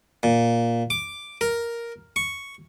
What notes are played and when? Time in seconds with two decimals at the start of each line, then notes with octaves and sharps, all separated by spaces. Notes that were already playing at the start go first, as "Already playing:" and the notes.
0.23 A#2
0.90 D6
1.41 A#4
2.16 C#6